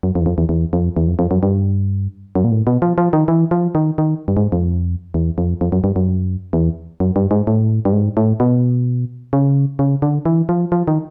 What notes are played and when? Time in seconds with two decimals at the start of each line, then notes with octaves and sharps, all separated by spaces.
0.03 F#2
0.15 F2
0.21 E2
0.26 F2
0.38 E2
0.49 E2
0.73 F2
0.96 E2
1.07 F2
1.19 F2
1.31 F#2
1.43 G2
2.35 F#2
2.44 A#2
2.51 A2
2.67 B2
2.82 F3
2.98 F3
3.13 D#3
3.28 E3
3.51 F3
3.75 D#3
3.98 D#3
4.28 G2
4.37 G#2
4.52 F2
5.14 E2
5.38 F2
5.61 F2
5.72 F#2
5.84 G2
5.96 F#2
6.53 E2
7.00 F#2
7.16 G2
7.31 G#2
7.47 A2
7.85 G2
7.93 G#2
8.17 A2
8.40 B2
9.33 C#3
9.79 C#3
10.02 D3
10.25 E3
10.49 F3
10.72 F3
10.88 D#3